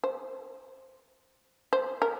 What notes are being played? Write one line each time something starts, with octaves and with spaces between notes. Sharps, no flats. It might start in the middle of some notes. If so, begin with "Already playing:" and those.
C5
C5
A#4